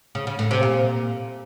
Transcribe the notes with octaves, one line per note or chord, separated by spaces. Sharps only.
C#3
C#3
A2
C3
A#2